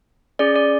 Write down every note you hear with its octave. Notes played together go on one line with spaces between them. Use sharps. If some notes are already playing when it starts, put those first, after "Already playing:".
C#4 G#4 D5
D5